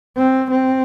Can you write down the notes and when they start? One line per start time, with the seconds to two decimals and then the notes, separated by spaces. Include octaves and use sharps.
0.17 C4
0.51 C4